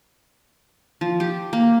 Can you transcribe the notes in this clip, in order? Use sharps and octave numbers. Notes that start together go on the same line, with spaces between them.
F3
G4
A#3